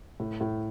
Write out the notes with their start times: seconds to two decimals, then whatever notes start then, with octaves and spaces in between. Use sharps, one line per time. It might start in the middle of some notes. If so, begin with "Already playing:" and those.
0.20 A2
0.41 A2